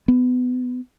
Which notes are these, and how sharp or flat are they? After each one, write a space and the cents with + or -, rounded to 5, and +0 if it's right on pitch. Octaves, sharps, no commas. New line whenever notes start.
B3 +25